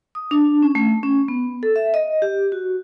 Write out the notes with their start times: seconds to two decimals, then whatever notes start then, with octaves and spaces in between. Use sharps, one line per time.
0.15 D#6
0.31 D4
0.62 C#4
0.75 A3
1.03 C#4
1.28 B3
1.63 A4
1.76 E5
1.94 D#5
2.22 G4
2.52 F#4